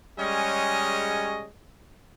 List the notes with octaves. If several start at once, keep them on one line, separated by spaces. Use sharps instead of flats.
G3 G#3 C#4 G#4 C#5 D#5